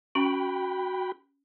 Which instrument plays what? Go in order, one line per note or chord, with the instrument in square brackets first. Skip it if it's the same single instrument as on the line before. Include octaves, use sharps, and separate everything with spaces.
[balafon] C#4 [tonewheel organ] F#4 G5 B5